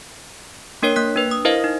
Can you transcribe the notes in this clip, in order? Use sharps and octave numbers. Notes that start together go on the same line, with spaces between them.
A#3 D4 A#4 C#5 C7
A#3 F#6 B6
D4 B4
D#6
E4 A#4 C5 D#5 F5
D#4